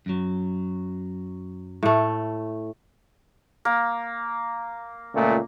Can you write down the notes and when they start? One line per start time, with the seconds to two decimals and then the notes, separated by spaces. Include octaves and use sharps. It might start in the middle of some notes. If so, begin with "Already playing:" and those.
0.06 F#2 F#3
1.83 A2 A3
3.65 A#3
5.14 C#2 A#2 A3